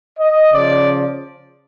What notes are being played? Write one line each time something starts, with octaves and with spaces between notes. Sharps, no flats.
D#5
C#3 F3 D5